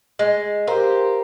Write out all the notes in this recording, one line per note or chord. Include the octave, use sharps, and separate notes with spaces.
G#3
G4 A#4 C5 F5 A#5